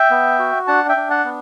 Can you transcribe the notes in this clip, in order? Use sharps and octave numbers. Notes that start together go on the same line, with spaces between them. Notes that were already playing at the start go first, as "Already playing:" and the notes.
Already playing: E5 G5
B3
F#4
D4 F#5 A5
E5 G5
D4
F#5 A5
B3